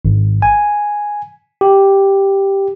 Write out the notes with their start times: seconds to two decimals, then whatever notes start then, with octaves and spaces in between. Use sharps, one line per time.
0.05 G#1
0.42 G#5
1.61 G4